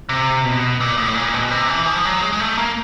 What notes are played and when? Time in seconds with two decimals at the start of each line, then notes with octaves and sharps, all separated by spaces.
0.09 C3
0.45 B2
0.80 A#2
0.97 A2
1.15 A#2
1.34 B2
1.51 C3
1.69 E3
1.86 F3
2.05 F#3
2.21 G#3
2.33 G#3
2.40 A3
2.58 A#3